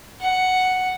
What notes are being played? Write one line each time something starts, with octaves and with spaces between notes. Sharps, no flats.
F#5